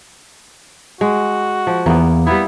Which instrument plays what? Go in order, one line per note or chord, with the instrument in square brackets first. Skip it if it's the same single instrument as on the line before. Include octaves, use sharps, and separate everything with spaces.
[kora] G#3 [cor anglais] F#4
[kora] F3
[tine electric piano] E2 [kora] A#3 B3
[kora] G3 E4 [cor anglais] B3